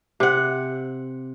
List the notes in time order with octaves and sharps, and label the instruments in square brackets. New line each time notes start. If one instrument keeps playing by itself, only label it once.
[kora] C3 F#5